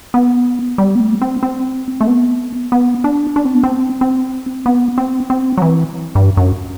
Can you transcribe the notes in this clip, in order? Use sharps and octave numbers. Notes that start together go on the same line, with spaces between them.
B3
G3
B3
A3
C4
C4
A3
B3
B3
D4
D4
C4
B3
C4
C4
B3
C4
C4
F#3
E3
G2
F#2